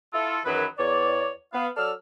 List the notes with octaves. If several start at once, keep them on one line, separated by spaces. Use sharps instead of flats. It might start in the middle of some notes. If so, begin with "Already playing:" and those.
E4 F4 A4
F#2 D#3 E3 F#3 G#4 B4
E2 C#5 D5
B3 F5
F#3 A4 D5 E6 F6